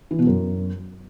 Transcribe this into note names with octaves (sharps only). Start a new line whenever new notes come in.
E3
B2
F#2